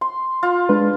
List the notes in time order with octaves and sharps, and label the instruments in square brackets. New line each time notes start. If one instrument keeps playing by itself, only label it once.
[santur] C6
F4
[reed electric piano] G#3 D4 B4